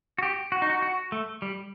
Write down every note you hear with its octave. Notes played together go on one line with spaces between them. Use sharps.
F#4
G4
F#4
D#4
F#4
F#4
A3
G3